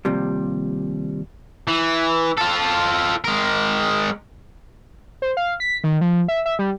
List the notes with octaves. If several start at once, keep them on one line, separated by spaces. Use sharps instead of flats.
D#2 C3 F3 G3
E3
F4 A4
G#3 A#4
C5
F5
B6
D#3
F3
E5
E5
G3